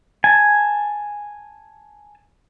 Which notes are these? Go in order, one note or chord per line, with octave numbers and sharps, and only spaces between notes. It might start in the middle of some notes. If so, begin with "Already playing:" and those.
G#5 A5